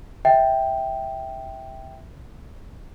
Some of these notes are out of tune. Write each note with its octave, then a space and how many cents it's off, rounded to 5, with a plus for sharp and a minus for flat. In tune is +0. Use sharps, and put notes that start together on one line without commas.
E5 -15 G5 +0